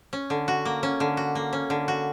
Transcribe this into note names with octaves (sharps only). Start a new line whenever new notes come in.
C#4
D3
F#4
A#3
C#4
D3
F#4
A#3
C#4
D3
F#4